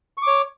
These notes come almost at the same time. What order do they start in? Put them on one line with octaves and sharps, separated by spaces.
C#6 D6 C#5